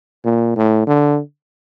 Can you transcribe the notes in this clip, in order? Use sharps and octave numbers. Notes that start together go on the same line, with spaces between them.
A#2
A2
D3